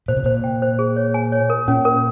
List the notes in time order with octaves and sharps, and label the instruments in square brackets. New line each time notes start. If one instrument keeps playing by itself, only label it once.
[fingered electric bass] A#2 [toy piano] C5
[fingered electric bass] C3
[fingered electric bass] A#2 [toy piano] C5
[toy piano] G5
C5
G#4
C#5
G#5
C#5
A#4
[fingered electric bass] A#2 [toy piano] C#4
[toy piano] A#4